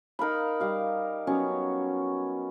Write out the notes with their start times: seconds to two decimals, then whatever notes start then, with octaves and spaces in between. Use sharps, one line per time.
0.19 D#4 A#4 F5 B5
0.60 G3 F5 A#5
1.27 F#3 B3 C#4